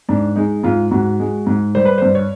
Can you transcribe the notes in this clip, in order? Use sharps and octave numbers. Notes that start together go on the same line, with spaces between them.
G#2 D4
G#3 D#4
G#2 F4
G#2 F#4
G#3
G#2
G3 C5
B4
G2 C5
C#5